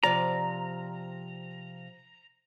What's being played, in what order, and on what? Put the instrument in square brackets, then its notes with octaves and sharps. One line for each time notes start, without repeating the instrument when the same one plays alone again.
[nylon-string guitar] C3 F3 D5 [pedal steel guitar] A#5